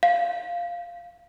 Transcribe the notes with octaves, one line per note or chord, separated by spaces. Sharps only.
F5